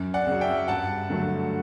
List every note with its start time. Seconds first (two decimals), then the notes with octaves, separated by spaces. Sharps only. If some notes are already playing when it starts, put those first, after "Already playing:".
Already playing: F#2
0.14 D5 F#5
0.27 C#3 F#3
0.41 E5 G5
0.68 G2 F#5 A5
1.10 D3 F#3 A3